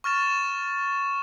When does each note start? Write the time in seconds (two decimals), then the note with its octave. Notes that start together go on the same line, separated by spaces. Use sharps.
0.04 C#6 F6 A6 E7